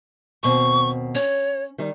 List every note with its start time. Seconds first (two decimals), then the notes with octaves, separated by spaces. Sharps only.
0.43 D#2 B2 C4 C#6
1.15 C#4 C#5
1.78 D#3 G3 D#4